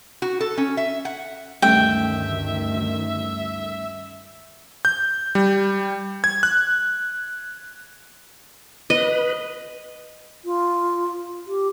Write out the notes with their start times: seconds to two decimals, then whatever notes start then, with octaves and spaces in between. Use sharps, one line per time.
0.22 F#4
0.41 A4
0.57 C#4
0.77 E5
1.05 F#5
1.62 D2 G2 D#3 G3 A3 C#4 E5 G5
4.85 G6
5.35 G3
6.24 G#6
6.43 F#6
8.90 B4 D#5
10.45 F4
11.47 G4